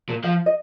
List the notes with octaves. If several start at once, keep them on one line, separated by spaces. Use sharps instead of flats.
A#2
F3 F5
D#5